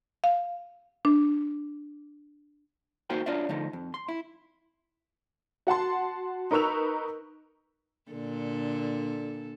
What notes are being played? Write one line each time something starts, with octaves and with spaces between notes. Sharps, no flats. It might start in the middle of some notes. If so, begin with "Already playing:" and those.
F5
D4
A#3 D#4 F#4 C5 G5
D4 F4 C#5 D5 E5
D3 F3 A3 D#4
F2
C6
E4
F#4 F#5 A5 C6
D#4 A#4 B4 C#6 E6 F7
A#2 D3 A4